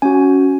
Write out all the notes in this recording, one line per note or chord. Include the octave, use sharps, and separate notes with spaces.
C#4 F#4 G#5